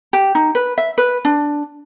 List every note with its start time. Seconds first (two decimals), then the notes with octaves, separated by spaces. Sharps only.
0.13 G4
0.35 D#4
0.55 B4
0.78 E5
0.98 B4
1.25 D4